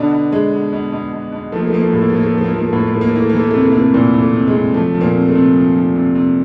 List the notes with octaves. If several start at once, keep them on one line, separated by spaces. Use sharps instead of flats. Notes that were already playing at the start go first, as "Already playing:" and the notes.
Already playing: B2 D3 D4
B2
B2 G#3
B2
B2
B2
B2
B2
F3 A3
A#3
A3
F3 A#3
A3
A#3
A2 A3
A#3
A3
A2 A#3
A3
A#3
F3 A3
A#3
F3 A3
A#3
A3
A2 A#3
A3
A#3
A2 A3
A#3
A3
E3 A#3
A3
A#3
E3 A3
A#3
A3
C3 A#3
A3
C3 A#3
A3
A#2 E3 A#3
E3
A3
C3
G#3
C3
F3 A3
F3
A#2 A#3
C3
A3
C3
F3
F3
C3
C3